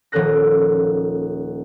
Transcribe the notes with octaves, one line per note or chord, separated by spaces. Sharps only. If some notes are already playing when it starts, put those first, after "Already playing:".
D#1 F3 C#4 A4 F#6 A#6